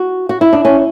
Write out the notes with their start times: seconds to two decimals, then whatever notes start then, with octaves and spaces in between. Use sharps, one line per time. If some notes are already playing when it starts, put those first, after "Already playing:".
Already playing: F#4
0.29 F#4
0.41 E4
0.53 D4
0.65 C#4